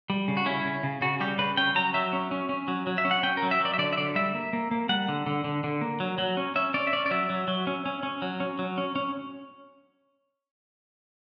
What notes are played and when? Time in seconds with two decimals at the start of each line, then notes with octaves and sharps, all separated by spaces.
0.10 G3
0.28 C#3
0.37 F#4
0.46 C#4 E4
0.65 C#3
0.83 C#3
1.02 C#3 F#4
1.20 G3 G4
1.39 C#3 B4
1.57 C#4 G5
1.75 F#3 A#5
1.94 F#3 E5
2.13 C#4
2.31 C#4
2.49 C#4
2.68 F#3
2.87 F#3
2.98 E5
3.05 C#4
3.11 F#5
3.23 C#4 G5
3.37 A#4
3.43 F#3
3.51 E5
3.61 F#3 D5
3.74 E5
3.78 D3 D5
3.93 E5
3.97 D3 D5
4.15 G3 E5
4.34 A#3
4.53 A#3
4.71 A#3
4.89 G3 F#5
5.09 D3
5.26 D3
5.44 D3
5.64 D3
5.81 A#3
6.00 F#3
6.18 F#3
6.37 C#4
6.56 C#4 E5
6.74 C#4 D5
6.87 E5
6.93 C#4 D5
7.06 D5
7.11 F#3 E5
7.30 F#3
7.48 F#3
7.67 C#4
7.86 C#4
8.03 C#4
8.22 F#3
8.40 C#4
8.59 F#3
8.78 C#4
8.96 C#4